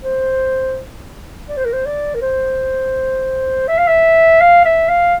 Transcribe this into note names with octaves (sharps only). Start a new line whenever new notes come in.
C5
D5
C5
A#4
C5
D5
A#4
C5
E5
F5
E5
F5
E5
F5